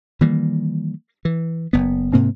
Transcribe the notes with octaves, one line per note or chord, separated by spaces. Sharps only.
D#3 E3 G3 A#3
E3
F#1 B3
G#2 C3 A#3 C4